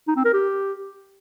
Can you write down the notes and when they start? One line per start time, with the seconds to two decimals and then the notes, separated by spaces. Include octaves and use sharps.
0.08 D#4
0.16 C4
0.25 A#4
0.33 G4